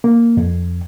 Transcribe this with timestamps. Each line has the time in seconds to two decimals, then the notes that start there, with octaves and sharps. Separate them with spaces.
0.04 A#3
0.37 F2